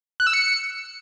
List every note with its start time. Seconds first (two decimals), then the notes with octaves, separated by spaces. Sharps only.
0.20 F#6
0.27 E6
0.33 C#7